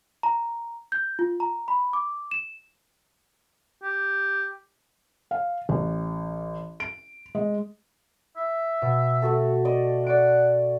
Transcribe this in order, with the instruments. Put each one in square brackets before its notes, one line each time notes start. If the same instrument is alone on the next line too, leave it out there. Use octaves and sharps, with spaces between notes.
[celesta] A#5
G6
F4
A#5
B5
D6
E7
[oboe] G4
[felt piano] F5
A1
D7
G#3
[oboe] E5
[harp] B2
[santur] A3 F#4 A4
D5 D#5
[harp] D5 D7 [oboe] F#5 [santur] E6